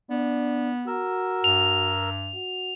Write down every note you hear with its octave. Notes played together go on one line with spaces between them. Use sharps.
B3 D4
F#4 A#4 E6
G2 F7
F#4